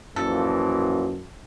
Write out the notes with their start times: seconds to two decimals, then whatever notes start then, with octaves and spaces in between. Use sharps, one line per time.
0.16 F#2 A#2 E3 F3 A4